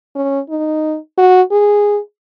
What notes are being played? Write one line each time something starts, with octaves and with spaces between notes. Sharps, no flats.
C#4
D#4
F#4
G#4